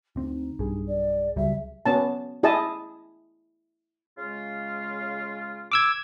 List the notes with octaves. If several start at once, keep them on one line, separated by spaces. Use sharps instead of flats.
D2 C4 D#4
B1 G2 G#4
D5
C#2 F#3 G3 E5
B3 C#4 A5
E4 G#4 D#5 A5
C#3 G#3 F4
D6 E6 G#6